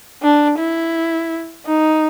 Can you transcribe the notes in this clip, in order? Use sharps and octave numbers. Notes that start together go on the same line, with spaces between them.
D4
E4
D#4